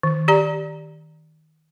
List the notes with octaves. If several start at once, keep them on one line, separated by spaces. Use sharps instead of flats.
D#3
G4 D5 A#5